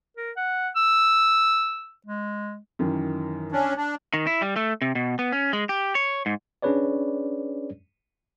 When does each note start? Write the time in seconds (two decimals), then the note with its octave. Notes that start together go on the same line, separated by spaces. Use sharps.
0.17 A#4
0.37 F#5
0.76 E6
2.07 G#3
2.79 F#2 D#3 E3
3.52 C#4 D4
3.77 D4
4.14 D#3
4.27 E4
4.42 G3
4.56 A3
4.82 C3
4.95 B2
5.19 B3
5.32 C#4
5.53 G#3
5.69 G4
5.95 C#5
6.26 G#2
6.62 C#4 D4 G#4 B4 C#5 D5